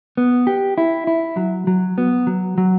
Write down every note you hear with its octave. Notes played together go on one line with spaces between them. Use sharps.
B3
G4
E4
E4
F#3
F#3
B3
F#3
F#3